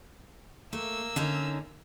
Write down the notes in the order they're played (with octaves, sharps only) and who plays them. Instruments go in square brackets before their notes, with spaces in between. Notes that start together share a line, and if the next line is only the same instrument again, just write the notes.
[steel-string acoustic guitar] A3 [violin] A#3 E6
[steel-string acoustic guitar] D3 C#4 D#4